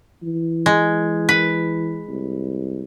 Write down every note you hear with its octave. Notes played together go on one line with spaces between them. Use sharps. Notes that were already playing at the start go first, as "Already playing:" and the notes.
E3
G#3
B4
C2